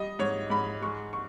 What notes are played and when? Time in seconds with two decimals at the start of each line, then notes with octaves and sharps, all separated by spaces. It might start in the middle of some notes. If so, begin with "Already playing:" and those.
Already playing: G3 D#5
0.19 G#2 C#5
0.50 G#2 B5
0.82 G#3 C#6
1.13 C#6